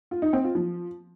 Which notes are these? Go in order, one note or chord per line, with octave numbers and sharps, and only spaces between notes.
F4
D#4
C4
F4
F3